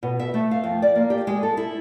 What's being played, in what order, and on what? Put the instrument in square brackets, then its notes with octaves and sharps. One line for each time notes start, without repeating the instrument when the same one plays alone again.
[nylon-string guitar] B2
E5
A3
F5
F2
D5
A#3
G4
G#3
A4
E4